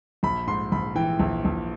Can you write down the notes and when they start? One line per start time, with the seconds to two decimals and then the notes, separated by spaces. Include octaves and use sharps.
0.23 A#1 B5
0.47 G#2 C6
0.72 A#1 B5
0.95 E3 G5
1.19 A#1
1.45 A#1